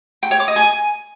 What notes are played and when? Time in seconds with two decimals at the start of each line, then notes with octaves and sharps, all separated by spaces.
0.23 G5
0.31 C#5
0.39 D6
0.48 D#5
0.56 G#5